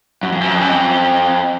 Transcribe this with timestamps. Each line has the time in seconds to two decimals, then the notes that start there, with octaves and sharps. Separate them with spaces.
0.23 F#2
0.32 F2
0.41 F#2
0.55 F2
0.61 F#2
0.69 F2